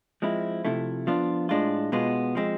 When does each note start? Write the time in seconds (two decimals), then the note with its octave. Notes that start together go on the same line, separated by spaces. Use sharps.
0.22 F3 G#3 C4 E4
0.65 C3 F3 A3 E4
1.07 F3 B3 D4 F4
1.49 A2 G#3 D4 F4
1.92 B2 G#3 B3 F4
2.35 F3 G#3 C4